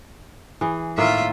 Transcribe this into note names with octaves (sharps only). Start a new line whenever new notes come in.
E3 G#4
A2 D#3 A#3 F4 E5